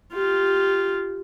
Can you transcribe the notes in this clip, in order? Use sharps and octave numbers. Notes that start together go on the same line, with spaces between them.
F4 G4